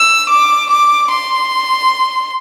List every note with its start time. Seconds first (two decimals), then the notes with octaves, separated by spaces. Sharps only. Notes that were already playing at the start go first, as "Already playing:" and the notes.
Already playing: E6
0.29 D6
0.70 D6
1.11 C6